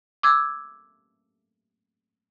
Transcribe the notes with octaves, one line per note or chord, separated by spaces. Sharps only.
D6 E6 G#6